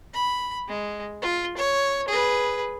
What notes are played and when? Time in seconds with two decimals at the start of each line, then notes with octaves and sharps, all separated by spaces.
0.14 B5
0.69 G#3
1.22 F4
1.57 C#5
2.08 G#4 B4